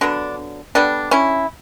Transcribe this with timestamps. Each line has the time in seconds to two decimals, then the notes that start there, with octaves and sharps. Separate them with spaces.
0.01 D3 F#3 B3 D4
0.75 D3 G3 B3 D4
1.11 C#4 E4